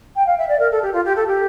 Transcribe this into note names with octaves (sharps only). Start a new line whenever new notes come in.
G5
F5
E5
D5
A#4
A4
G4
F4
G4
A4
G4